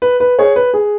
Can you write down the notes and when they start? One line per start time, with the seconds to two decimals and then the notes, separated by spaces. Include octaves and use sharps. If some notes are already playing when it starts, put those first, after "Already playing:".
0.02 B4
0.20 B4
0.38 G#4 C#5
0.56 B4
0.74 G#4